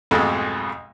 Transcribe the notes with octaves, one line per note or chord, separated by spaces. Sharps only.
B1 F2 G#2 B2 G#3 A3